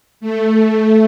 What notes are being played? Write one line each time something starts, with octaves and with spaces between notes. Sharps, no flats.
A3